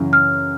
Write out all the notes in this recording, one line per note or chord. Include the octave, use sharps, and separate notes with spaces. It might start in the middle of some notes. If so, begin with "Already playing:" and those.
Already playing: F#2 C#3 E3
F6